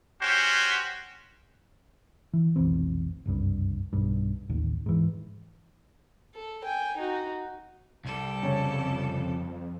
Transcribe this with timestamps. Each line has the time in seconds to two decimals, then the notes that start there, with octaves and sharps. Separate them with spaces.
0.21 C#4 F#4 G4 C5
2.33 E3
2.56 F1 B1 E3 C4
3.26 F#1 C2 G2
3.93 B1 G2
4.50 A1 D#2
4.86 G#2 E3
6.34 A4
6.64 G5 G#5
6.97 D#4 F#4
8.05 C2 G3 A4
8.43 F2 C#3 C#5 A5